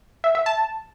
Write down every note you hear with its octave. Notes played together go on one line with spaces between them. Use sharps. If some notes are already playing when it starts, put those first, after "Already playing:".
E5
E5
A5